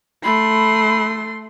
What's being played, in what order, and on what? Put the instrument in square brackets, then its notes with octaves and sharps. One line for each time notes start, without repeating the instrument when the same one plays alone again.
[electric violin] A3 C6 [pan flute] B5